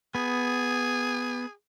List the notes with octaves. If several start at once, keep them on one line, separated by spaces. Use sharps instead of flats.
B3 G#4